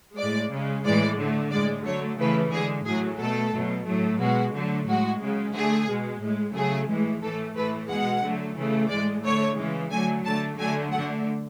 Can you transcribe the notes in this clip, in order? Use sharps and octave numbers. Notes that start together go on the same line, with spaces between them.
A2 G#3 D5
C#3 G#3
A2 E3 G#3 D5
D3 A3
A2 G#3 D5
D3 F#3 A3 C#5
C#3 E3 A3 B4
D3 G#3 G#4
A2 F#3 A3 G#4
B2 A3 A4
B2 F#3 A3
A2 F#3 A3
B2 G#3 F#4
D3 F#3 A3
A2 G#3 F#4
C#3 G#3
D3 A3 G#4
B2 G#3
A2 G#3
C#3 F#3 A3 G#4
A2 E3 G#3
A2 E3 A3 A4
A2 E3 A3 B4
B2 G#3 F#5
D3 F#3 A3
C#3 E3 A3
A2 G#3 D5
D3 A3 C#5
C#3 E3 G#3
D3 F#3 A3 G#5
D3 A3 A5
D3 F#3 A3 G#5
D3 A3 F#5